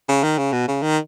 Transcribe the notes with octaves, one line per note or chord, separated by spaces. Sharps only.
C#3
D#3
C#3
B2
C#3
D#3